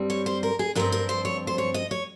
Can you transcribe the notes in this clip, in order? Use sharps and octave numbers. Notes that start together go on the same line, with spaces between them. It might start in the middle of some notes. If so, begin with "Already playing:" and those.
Already playing: G2 G3 C4
C#5
C5
A#4
G#4
G2 F3 C4 A#4
A#4
C5
C#5
C5
C#5
D#5
C#5